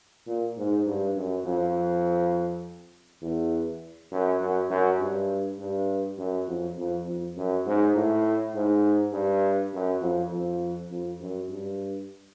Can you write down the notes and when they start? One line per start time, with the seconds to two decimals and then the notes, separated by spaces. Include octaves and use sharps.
0.27 A#2
0.57 G#2
0.86 G2
1.15 F#2
1.45 F2
3.22 E2
4.12 F#2
4.40 F#2
4.70 F#2
4.99 G2
5.59 G2
6.18 F#2
6.48 F2
6.77 F2
7.07 F2
7.36 F#2
7.66 G#2
7.95 A2
8.54 G#2
9.13 G2
9.73 F#2
10.02 F2
10.31 F2
10.91 F2
11.20 F#2
11.49 G2